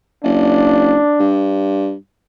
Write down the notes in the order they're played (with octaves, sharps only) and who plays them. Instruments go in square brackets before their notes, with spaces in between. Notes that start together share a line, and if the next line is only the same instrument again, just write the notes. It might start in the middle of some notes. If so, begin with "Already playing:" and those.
[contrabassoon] F#1 [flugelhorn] D4
[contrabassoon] G2